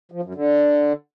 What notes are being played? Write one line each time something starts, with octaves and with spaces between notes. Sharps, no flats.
F3
F#2
D3